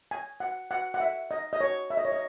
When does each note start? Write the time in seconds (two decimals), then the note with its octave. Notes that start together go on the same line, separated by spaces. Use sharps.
0.11 G#5
0.40 F#5
0.71 F#5
0.94 F#5
1.00 E5
1.31 D#5
1.53 D#5
1.61 C#5
1.90 E5
1.97 D#5
2.05 C#5
2.12 D#5